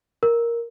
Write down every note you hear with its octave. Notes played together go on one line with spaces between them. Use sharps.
A#4